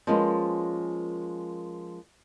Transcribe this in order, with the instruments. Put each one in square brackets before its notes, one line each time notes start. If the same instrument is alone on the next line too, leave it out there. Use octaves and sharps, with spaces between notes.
[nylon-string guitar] F3 G#3 A#3 C#4 A#4 B4